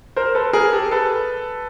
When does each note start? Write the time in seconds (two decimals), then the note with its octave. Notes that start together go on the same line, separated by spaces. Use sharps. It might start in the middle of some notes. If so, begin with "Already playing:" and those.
0.16 A#4 C5
0.35 A4 B4
0.53 G#4 A#4
0.73 G4 A4
0.91 A4 B4